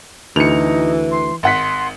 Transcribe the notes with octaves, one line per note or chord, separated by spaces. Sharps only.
D2 E3 D#4 C#7 F7
C6
G#1 F#5 C6 B6